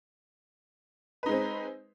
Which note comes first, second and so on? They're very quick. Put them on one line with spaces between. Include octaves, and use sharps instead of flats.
B4 D#4 G#3 C4